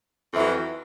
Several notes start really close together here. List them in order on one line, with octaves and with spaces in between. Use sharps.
F2 E3 F#3